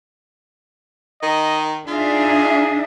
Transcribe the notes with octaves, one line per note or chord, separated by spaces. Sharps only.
D#3 D#5
D4 D#4 F4 G#4 E5